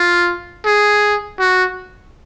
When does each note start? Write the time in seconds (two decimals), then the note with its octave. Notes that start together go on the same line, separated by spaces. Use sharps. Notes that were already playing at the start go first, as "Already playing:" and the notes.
Already playing: F4
0.66 G#4
1.40 F#4